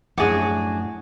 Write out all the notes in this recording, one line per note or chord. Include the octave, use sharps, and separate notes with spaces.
F#2 A2 F3 D4 F#4 G#4 D6